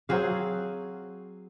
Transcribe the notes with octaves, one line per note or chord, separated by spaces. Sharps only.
F#3 C4 G#4 F5